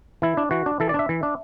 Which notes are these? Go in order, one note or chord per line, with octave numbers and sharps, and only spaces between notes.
E3 E4
D4
E3 F#4
D4
E3 A4
D5
D4 E5
E3
D4